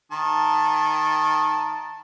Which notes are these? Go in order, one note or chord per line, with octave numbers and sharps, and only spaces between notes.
D#3 A5